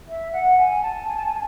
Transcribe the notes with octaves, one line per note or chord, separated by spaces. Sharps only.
E5
F#5
G#5
A5
G#5
A5
G#5